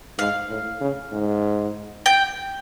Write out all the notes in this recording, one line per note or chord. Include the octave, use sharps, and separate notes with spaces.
G#2 F5
A2
C#3
G#2
G5